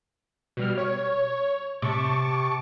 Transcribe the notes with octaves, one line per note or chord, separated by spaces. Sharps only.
B2 G3 F6
C#5
C3 A5 C#6 D6